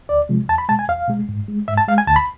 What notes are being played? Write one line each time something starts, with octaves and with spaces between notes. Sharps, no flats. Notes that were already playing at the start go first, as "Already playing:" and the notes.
D2 D5
C3 F3 G#3
E2 A5
B5
B2 G#3 A5
G#5
E2 F5
B2 G#3
G#2
G#3
G#2 E5
A5
G#3 F5
G#5
D2 A5
B5